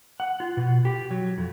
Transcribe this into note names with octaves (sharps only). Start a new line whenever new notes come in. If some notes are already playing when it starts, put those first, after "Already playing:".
F#5
F4
B2
G4
F#3
F2